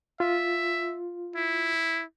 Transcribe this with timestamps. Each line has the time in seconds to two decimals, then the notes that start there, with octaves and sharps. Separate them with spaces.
0.20 F4 E5
1.36 E4